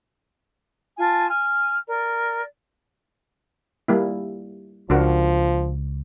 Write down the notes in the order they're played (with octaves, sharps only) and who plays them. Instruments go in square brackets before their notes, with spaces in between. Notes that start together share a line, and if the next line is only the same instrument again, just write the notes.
[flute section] F4 G#5 A5
G#5 F6
A#4 D5
[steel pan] G3 A#3 E4
[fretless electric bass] C#2 [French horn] F3 [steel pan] D4 F#4 A#4